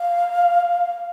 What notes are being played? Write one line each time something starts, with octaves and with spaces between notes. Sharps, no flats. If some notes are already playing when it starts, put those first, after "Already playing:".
Already playing: F5